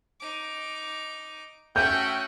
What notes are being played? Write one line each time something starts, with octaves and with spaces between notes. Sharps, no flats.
D#4 D6
A3 C#4 F#4 E5 F#5 G5 G6